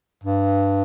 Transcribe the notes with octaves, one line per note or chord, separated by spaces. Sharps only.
G2